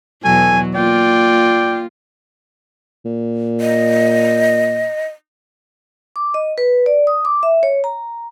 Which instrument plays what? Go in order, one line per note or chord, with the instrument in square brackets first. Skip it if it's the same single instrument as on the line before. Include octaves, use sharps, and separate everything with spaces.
[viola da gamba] E2 B2 F#3 [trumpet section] A4 G#5
[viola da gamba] A#3 F4 [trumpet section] D5 G5
[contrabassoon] A#2
[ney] D#5
[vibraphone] D6
D#5
B4
D5
D#6
D6
E5
C#5
A#5